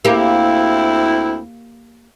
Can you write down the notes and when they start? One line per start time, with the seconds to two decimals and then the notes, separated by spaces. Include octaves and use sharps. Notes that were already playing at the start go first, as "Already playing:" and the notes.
0.05 D2 A#3 C4 E4 G4